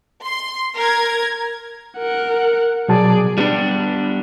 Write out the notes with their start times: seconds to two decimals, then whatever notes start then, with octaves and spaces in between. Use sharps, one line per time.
0.25 C6
0.77 A#4 G#6
1.98 A#4 F#5
2.89 B2 F#3 G#4 D5 A5
3.38 G3 B3 D4